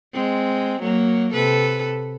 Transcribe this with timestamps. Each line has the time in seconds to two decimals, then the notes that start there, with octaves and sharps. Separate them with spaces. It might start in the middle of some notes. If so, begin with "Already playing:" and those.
0.13 G#3 C4
0.81 F#3 A#3
1.33 C3 A4 B4